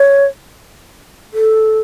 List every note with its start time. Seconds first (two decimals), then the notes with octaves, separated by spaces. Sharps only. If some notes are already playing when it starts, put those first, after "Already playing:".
Already playing: C#5
1.33 A4